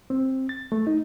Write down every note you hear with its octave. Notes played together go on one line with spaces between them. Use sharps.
C4
A6
A3
D#4